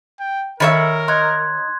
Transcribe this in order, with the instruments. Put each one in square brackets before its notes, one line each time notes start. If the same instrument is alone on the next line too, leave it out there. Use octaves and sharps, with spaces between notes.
[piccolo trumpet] G5
[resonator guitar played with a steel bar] D#3 C#5 E5 [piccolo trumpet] A#4 [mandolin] B5 C6
[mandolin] D#4 A#5 [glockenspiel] C6 F#6 G#6